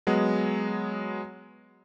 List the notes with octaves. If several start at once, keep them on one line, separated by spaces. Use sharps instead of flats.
F#3 G#3 B3